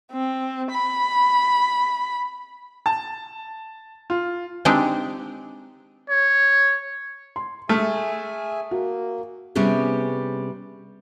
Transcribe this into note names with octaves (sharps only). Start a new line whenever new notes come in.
C4
B5
A5
F4
G#3 C4 D4 D#4 G4
C#5
C6
A3 G#4 E5 G#5 F6
A#3 F#4
C3 G3 B3 C#4 G#4